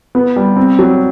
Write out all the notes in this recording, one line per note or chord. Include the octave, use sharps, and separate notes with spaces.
B3
G3
C4
F#3